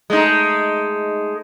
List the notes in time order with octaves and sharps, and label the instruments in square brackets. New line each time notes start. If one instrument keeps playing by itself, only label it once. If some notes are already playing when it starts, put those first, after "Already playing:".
[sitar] G#3 A3 D#4